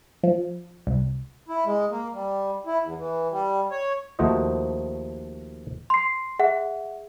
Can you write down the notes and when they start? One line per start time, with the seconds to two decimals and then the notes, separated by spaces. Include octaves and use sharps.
0.23 F3
0.87 C2
1.49 E4
1.66 G#3
1.91 A#3
2.14 G3
2.66 E4
2.83 E2
2.99 E3
3.31 G3
3.71 C#5
4.19 D#2 F3 A3 F#4 C5 D#5
5.90 C6 C7
6.39 G#4 E5 F#5